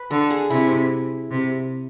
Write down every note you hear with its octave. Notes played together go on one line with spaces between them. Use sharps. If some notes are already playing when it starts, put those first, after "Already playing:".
Already playing: B4
D3 A4
G#4
C3 E4
C3